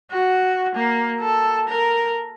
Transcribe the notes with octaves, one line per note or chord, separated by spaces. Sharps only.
F#4
A#3
A4
A#4